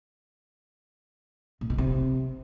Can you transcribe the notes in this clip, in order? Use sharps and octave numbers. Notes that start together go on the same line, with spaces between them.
A#2
B2
C3